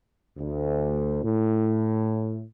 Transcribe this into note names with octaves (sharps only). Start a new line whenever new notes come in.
D2
A2